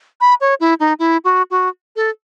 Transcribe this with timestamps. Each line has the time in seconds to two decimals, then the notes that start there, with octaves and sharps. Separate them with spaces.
0.21 B5
0.41 C#5
0.60 E4
0.80 D#4
0.99 E4
1.24 F#4
1.51 F#4
1.96 A4